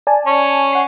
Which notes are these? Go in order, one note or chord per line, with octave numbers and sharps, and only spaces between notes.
D5 G#5 A5
C#4
F#5 C7